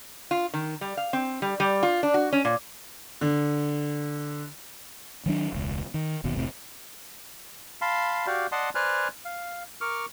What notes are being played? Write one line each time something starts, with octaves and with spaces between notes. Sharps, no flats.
F4
D#3
G3
F5
C4
G3
G3
F4
D4
F#4
C#4
A#2
D3
D#3 F#3 D4
E1 C#2
D#3
D#1 D#2 B2
F1 A2 C3
F5 A5 B5 C6
F#4 G4 D5 F5
D5 D#5 F#5 A5 C6
B4 C5 D5 G#5 F6 F#6
F5
A#4 C#6 D6 F6